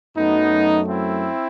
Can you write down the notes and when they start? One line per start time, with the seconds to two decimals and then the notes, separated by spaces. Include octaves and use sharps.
0.16 F#2 F#3 A3 B3 D#4
0.88 C4 E4